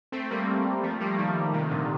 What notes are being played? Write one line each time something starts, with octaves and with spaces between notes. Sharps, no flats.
A3 C4
G3 A#3
F3 A3
G3 A#3
D#3 G3
C3 D#3
A#2 D3